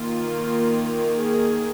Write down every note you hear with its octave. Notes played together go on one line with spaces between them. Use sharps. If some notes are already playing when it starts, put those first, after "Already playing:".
Already playing: D#3 A#3 F4
G#4